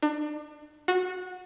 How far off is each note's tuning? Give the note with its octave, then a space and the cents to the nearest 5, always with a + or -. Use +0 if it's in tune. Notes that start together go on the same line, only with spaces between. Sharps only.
D4 +35
F#4 -20